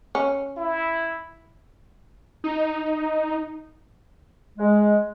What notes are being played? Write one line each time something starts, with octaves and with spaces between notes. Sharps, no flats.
C#4
E4
D#4
G#3